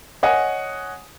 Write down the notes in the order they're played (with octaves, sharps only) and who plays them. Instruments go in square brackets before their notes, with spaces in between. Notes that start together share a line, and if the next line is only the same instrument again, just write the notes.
[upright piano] C#5 D#5 F#5 G#5 D#6